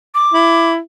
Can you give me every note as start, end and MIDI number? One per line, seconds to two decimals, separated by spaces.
0.15 0.70 86
0.33 0.78 64